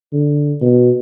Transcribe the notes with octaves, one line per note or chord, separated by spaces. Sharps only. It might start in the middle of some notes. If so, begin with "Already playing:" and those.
D3
B2